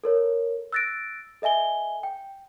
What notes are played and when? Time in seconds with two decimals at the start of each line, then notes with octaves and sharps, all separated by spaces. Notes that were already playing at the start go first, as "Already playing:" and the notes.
0.04 A4 A#4 C#5
0.72 E6 F#6 A6 A#6 D7
1.42 A4 D#5 E5 G#5 G7
2.03 G5